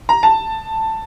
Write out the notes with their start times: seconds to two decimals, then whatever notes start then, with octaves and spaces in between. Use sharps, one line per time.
0.09 A#5
0.23 A5